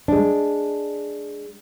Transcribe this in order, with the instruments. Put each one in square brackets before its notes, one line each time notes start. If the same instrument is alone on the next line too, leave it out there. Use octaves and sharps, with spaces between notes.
[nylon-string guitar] G#3 D4